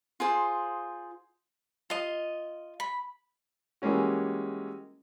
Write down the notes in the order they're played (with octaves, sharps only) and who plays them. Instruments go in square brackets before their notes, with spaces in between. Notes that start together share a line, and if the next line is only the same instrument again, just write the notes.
[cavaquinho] F4 G#4 C5
F4 D#5
B5
[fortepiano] E3 G3 G#3 A#3 C#4 F#4